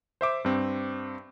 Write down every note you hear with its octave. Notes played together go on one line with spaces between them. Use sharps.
C5 E5 D6
G2 C4